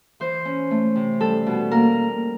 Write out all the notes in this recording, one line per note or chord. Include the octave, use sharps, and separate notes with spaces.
E3 C5
C#4
A3
C3
G3 A4
B2
A#3 A#4